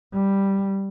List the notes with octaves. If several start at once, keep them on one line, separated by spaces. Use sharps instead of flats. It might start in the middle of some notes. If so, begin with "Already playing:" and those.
G3